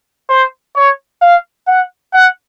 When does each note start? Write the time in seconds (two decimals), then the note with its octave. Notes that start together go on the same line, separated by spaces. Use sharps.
0.29 C5
0.75 C#5
1.22 F5
1.67 F#5
2.13 F#5